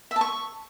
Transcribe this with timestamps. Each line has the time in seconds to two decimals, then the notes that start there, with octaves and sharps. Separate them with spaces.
0.11 E5
0.16 A5
0.21 C#6